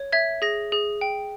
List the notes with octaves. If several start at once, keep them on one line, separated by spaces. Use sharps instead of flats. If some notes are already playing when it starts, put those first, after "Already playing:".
Already playing: C#5
E5 G#6
G#4 A#6
G#4
G5